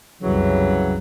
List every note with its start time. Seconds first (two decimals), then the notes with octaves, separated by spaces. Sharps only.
0.21 C2 F#2 C#3 E3 F#3 G3